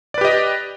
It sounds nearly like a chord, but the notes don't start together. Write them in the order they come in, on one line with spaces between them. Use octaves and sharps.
D5 B4 G4 D#5